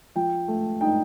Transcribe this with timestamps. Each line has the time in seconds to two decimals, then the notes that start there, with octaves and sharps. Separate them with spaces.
0.16 F3 G5
0.48 A3
0.81 D#4 G5